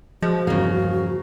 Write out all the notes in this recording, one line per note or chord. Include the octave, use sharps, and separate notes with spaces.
F3 G#3 F#4
E2 G2 C#3 A#3